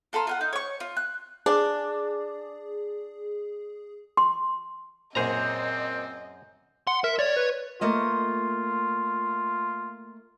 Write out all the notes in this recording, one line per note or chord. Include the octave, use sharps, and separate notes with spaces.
F4 A4 A#5 C6
F4 F5 F#5
D#4
C#5 C#6
F4
F#6
D4 G#4
C6
F#2 A#2 C4 G#4 C5 D#5 A#5 G6
F#5 C6
A#4 E5
C#5 D5
B4
A3 A#3 F4 D#5